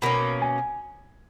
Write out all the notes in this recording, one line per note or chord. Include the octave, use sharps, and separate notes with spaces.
B2 A#3 C#4 B5
G#5